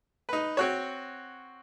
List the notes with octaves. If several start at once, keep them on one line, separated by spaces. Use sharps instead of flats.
D#4 B4
C4 F#4 C#5